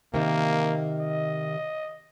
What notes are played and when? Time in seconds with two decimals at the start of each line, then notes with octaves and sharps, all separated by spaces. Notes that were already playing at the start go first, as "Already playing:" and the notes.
0.14 C3 D#3 A#3
1.00 D#5